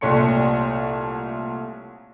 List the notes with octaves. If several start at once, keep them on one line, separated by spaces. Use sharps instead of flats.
C2 A#2 A3 C#5 C6 C#7